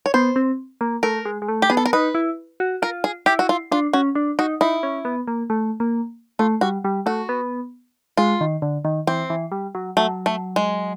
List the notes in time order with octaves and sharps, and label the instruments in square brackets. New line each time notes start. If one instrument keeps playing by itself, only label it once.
[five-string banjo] C#5
[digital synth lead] B3 [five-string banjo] C5
[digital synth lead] C4
A#3
[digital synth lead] A3 [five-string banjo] A#4
[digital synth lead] G#3
G#3
A3
[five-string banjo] G4
[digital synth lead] B3 [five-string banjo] G#4
[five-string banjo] A4
A#4
[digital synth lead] D#4 [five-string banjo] B4
[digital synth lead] E4
F#4
[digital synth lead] F4 [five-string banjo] A#4
[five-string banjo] G#4
[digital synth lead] E4 [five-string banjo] G4
[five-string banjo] F#4
F4
[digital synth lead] D4 [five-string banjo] F4
[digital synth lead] C#4 [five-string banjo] F#4
[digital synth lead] D4
[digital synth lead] D#4 [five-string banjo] F#4
[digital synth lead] D#4 [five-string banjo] E4
[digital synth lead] C#4
B3
A#3
A3
A#3
[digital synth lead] A3 [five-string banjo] F4
[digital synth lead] G3 [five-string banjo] F#4
[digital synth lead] G3
[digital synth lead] A3 [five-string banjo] F#4
[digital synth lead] B3
[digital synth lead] G#3 [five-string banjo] F4
[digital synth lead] D#3
D3
D#3
[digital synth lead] E3 [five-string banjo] C4
[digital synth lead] E3
G3
F#3
[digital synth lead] F#3 [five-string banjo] A3
[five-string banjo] A3
G#3